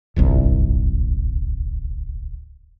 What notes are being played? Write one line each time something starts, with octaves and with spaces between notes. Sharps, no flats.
D1 G1 C2